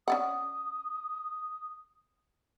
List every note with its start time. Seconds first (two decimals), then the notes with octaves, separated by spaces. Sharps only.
0.08 C#4 D5 F#5 D#6